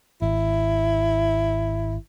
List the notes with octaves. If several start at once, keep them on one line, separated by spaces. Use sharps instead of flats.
G#1 E4